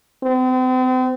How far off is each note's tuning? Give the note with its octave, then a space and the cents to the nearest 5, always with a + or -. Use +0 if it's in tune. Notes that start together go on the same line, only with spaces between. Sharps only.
C4 -40